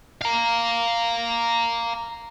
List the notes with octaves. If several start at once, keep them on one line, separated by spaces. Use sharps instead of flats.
F5 A#5